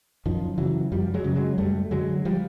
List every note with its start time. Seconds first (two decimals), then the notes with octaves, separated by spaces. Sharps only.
0.26 F#2 D#3 F3
0.58 C#3 E3 F#3
0.92 F#2 F3 G3
1.14 F#3 G#3
1.24 C#3
1.35 F#3 G#3
1.58 F#2 G3 A3
1.91 D3 F#3 G#3
2.25 F3 G3